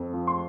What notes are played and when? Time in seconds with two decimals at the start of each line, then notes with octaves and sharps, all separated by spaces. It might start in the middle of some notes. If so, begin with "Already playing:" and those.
Already playing: F2
0.13 F3
0.27 C6